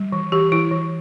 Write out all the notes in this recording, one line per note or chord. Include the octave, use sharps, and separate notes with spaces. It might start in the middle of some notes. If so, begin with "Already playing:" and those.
Already playing: G3
E3
E3 G4
E3 E4
E3